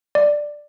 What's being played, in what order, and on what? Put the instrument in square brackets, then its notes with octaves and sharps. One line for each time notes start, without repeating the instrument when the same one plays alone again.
[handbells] D5